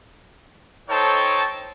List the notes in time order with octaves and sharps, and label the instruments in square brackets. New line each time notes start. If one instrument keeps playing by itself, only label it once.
[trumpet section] D#4 A4 C5 C#5 G5 A5